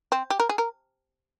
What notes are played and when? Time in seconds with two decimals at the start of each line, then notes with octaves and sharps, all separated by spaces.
0.12 C4
0.30 G4
0.40 A#4
0.49 G#4
0.58 A#4